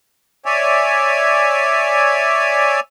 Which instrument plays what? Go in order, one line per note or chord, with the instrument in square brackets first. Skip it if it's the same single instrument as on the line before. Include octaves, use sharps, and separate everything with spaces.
[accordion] C#5 D5 E5 G#5